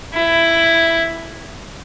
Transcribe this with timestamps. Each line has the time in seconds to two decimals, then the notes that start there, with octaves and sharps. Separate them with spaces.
0.14 E4